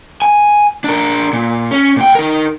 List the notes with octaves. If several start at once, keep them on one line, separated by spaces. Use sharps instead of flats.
G#5
D4 A#4
A#2
C#4
A#2 G5
D#4 A#4